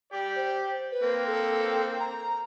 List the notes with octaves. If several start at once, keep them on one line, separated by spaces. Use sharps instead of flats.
G4 D5
C5
B4
A#3 C4
A4
A#5